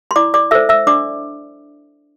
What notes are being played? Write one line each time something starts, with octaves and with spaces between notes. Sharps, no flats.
C6
E4 D5 D6
D5 D6
A4 C5 E5 E6
E5 E6
D4 D5 D6